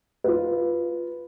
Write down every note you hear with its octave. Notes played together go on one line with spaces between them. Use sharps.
F4 B4